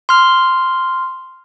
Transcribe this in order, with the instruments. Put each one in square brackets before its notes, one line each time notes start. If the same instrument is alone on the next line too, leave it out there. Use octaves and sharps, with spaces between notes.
[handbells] C6 F6